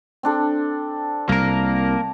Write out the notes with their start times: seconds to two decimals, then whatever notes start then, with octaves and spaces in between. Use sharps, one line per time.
0.23 C4 D4 A4
1.29 C2 A#3 A#4